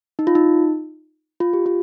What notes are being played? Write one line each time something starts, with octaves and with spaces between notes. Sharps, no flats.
D#4
F4
D#4
F4
G4
F4